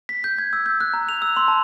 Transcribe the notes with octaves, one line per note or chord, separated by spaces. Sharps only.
B6
G6
G#6
E6
G6
F#6
A#5
F7
E6
C6
A5